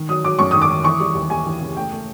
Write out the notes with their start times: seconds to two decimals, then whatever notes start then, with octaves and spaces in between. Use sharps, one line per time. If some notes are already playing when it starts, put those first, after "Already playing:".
Already playing: D#3
0.09 F#3 D#6
0.25 F#3 D6
0.39 F#2 C#6
0.51 D#3 D#6
0.62 D6
0.70 D#3
0.84 E3 C#6
1.00 G3
1.15 D#2
1.30 D#2 G#5
1.46 E3
1.61 C#3
1.77 A3 G5
1.92 A3